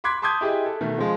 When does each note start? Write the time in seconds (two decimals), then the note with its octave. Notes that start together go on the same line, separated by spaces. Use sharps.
0.04 B5 C6 D6 F#6 G#6 B6
0.22 A5 C6 D6 D#6 G6 G#6
0.41 E4 G4 G#4 D#5
0.66 A4
0.81 B2 D#3 A3
0.98 F3 G#3